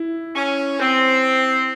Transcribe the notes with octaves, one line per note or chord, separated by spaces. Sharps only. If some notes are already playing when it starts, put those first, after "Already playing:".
Already playing: E4
C#4
C4